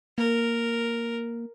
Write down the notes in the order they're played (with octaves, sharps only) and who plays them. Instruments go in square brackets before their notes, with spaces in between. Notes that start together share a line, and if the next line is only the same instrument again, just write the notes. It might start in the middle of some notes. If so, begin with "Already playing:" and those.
[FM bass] A#3 [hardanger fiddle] A#4